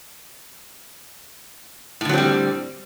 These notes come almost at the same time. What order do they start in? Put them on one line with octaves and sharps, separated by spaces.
A2 D3 F#3 C4 G3